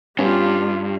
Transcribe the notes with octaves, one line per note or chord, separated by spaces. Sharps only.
G2 B3 C#4 F4 G4